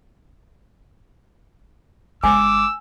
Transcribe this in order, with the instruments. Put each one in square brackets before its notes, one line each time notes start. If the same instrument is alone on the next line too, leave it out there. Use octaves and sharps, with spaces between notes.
[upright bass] G1 G#3 [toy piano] G#5 [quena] D6 [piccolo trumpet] E6